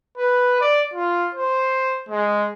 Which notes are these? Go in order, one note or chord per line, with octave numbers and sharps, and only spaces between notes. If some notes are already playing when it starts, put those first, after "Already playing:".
B4
D5
F4
C5
G#3